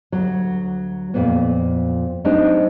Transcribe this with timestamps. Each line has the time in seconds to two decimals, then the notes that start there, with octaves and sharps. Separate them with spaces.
0.12 D2 F#3
1.14 F2 A#2 B3
2.25 F#3 A3 C4 D4 D#4